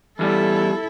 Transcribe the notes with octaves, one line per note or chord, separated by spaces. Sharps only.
E2 G3 E4 A4